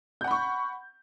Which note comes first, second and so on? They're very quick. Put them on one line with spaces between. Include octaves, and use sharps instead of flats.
G6 F#5 B5 C#6